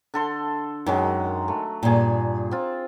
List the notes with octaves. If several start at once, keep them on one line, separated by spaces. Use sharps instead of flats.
D3 A4 C6
F#2 D#3 F#3 G#3
A3
G2 A#2 G#4 A#5
C4 F4